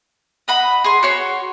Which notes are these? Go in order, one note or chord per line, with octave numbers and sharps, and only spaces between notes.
D#5 F#5 B5
G#4 C6
F#4 C#5 C6